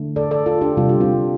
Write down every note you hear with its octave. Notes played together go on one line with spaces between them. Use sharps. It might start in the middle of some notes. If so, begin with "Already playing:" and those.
Already playing: D3 A3
A4 D5
A4 D5
F4 A4
D4 G4
C3 G3 F4
G4
C4 F4